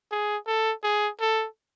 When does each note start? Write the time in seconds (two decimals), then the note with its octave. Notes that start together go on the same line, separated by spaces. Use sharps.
0.11 G#4
0.47 A4
0.83 G#4
1.20 A4